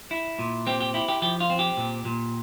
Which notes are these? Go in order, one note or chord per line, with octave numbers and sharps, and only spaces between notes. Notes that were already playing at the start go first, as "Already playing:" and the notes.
E4
A#2
C4 G4
G4
E4 G4
G4
F3 G4
F4
C4
G4
A#2
A#2